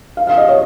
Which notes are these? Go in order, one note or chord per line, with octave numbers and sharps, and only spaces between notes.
F5
F5
D#5
C#5